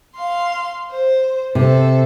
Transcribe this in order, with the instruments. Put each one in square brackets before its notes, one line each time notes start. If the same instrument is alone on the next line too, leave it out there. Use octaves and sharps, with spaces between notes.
[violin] F5 C6
C5
[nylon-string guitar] C3 [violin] A4 C5